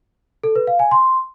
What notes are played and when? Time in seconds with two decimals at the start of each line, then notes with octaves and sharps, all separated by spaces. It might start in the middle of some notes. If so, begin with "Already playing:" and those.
0.43 A4
0.55 B4
0.67 F5
0.79 G#5
0.91 C6